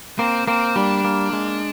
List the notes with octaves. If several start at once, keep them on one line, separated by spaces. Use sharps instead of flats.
A#3 C4
A#3 C4
G3 D4
A#3
G#3